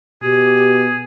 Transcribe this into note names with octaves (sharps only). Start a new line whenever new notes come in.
B2 G4 G#4